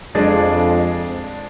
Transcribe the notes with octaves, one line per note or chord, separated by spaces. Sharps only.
F2 G#3 D4 G#4 D5